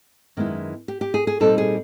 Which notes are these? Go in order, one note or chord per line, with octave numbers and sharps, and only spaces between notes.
F#2 D#3 G#3 B3 E4
G4
G4
G#4
G#4
A#2 G3 C4 D#4 A4
G#4